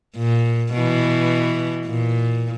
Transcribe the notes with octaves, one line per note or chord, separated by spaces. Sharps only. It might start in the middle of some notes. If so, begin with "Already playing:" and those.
A#2
B2 E3
A#2